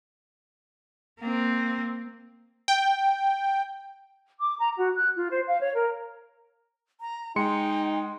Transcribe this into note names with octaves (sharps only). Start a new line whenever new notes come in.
A#3 C4
G5
D6
A#5
F#4
F#6
F4
C5
F5
C#5
A#4
A#5
G#3 D#4 G5 C6 C#7